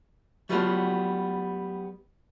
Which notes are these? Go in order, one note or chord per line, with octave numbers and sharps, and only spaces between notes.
F#3 G3 A3 B3 F4